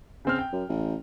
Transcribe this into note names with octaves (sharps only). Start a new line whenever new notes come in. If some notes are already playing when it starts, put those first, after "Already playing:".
C#3 C4 F6
G5
F#2
A1